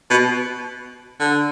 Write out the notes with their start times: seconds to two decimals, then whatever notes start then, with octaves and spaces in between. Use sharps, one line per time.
0.10 B2
1.20 D3